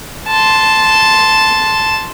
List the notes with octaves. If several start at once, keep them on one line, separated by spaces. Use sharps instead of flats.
A5 C6